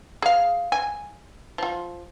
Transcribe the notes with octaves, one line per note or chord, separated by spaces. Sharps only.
G#4 F5
G#5
F3 F4